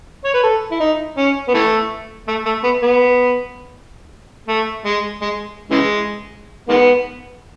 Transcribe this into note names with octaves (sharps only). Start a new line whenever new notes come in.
C#5
B4
A4
E4
D#4
C#4
B3
E3 A3
A3
A3
B3
B3
A3
G#3
G#3
C#3 E3 G#3
D#3 G#3 B3